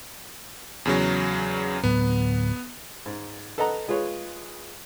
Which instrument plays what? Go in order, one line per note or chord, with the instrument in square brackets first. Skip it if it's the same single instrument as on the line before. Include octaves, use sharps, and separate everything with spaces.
[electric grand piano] E2 C#3 F#3
[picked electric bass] D2 A2 F#3 [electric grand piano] B3
[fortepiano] G#2
A4 B4 D#5 F#5 A#5
G#3 F4 G#4 B4 C#5